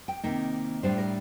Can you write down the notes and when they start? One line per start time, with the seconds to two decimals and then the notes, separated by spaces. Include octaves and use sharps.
0.08 G5
0.23 C3 D#3 A#3 D#4
0.83 A2 G3 D4 C5
0.98 A#4